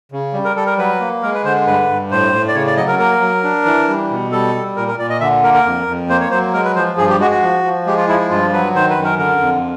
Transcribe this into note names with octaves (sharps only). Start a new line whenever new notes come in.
C#3
G3
A#4
G3 A4
A#4
F#3 B4
A#3
G#3 A#4
B4
D3 C5
G2 B4
G2
A2 C5
A2
D5
C#3 C#5
D5
F#3 D#5
A#4
A#3 A#4
F#3
D4
E3
G3
B2
G3 A4
G3
A#2 A#4
A#4
A#2 D5
D#5
D3 E5
A#3 A#4
A#4
F2
F2
A#3 C5
C#5
F#3 C5
G#3 A#4
B4
F3 C5
G2 G#4
G4
G#3 F#4
F#4
F3
F3
G#3 G4
F4
F3 E4
E4
G2 F4
F#3 B4
D#3 C5
B4
F#2
A#4
D3 A#4
F2